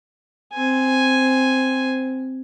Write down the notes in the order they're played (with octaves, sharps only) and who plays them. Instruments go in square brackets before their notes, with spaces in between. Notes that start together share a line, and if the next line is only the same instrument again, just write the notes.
[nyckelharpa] C4 G#5